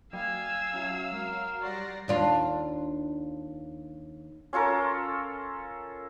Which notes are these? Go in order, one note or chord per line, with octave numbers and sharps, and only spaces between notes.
F#3 F#4 F5 G5 G#5 E6
F#3 C#4 E5
G#3 A#4
G3 D5 F#5 A#5 C6 C#6 A#6 C7
D#2 D4 F4
C#4 F4 A4 A#4